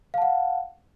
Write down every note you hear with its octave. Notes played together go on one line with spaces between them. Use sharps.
F5 F#5 A5